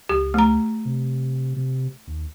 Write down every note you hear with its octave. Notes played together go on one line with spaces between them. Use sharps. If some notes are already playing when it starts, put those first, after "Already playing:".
C#2 G4
A3 A#5
C3
C3
D#2